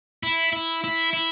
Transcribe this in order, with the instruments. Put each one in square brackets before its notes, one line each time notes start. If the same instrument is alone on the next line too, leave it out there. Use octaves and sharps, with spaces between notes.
[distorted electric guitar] E4
E4
E4
E4